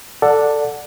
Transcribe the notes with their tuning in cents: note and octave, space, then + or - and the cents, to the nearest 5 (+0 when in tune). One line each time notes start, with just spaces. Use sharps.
A4 +10 D5 +0 F#5 -15